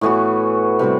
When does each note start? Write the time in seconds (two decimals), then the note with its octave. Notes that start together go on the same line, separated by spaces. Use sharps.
0.01 A2 E3 B3 F#4
0.79 C3 G3 C4 F#4